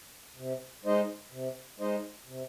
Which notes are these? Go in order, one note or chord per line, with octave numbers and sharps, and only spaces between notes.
C3
G#3 D#4 C5 D#5
C3
G#3 D#4 C5 D#5
C3